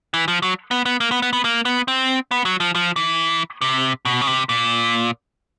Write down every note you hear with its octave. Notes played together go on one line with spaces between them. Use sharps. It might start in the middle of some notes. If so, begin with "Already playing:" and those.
E3
F3
F#3
B3
B3
A#3
B3
B3
B3
A#3
B3
C4
B3
F#3
F3
F3
E3
C3
B2
C#3
C3
A#2